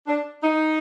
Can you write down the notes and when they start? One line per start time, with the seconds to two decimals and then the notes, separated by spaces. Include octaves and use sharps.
0.07 D4
0.43 D#4